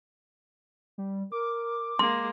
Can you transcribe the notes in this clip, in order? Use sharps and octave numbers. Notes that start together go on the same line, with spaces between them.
G3
A#4 D6
G#3 A#3 C6